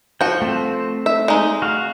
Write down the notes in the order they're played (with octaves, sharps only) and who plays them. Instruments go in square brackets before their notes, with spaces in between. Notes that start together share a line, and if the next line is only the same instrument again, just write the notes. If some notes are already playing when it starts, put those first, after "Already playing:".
[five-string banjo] F3 F#4 [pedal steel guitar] G5
[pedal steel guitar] A3 C4
[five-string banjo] E5
G#3 D#4
[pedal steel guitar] F#4 F5